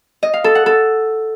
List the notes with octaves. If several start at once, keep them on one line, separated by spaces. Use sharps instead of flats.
D#5
F5
A4
F#5
A4